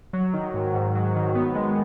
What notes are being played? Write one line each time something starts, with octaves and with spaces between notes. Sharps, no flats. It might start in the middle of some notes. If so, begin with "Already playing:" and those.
F#3
D#3
G#2
G#2
F#3
D#3
B3
G#3